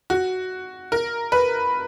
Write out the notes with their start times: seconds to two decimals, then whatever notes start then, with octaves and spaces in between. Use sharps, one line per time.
0.10 F#4
0.92 A#4
1.32 B4